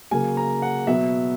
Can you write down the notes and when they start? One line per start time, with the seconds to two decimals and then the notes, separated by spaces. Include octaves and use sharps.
0.11 C#3 F#3 A#3 G#5
0.37 A#5
0.62 F#5
0.87 B2 F#3 B3 E5